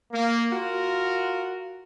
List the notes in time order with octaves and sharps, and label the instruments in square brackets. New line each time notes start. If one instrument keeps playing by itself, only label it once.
[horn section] A#3
F4 F#4 A#4